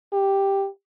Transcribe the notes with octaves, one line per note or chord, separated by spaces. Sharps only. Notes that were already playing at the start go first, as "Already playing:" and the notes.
G4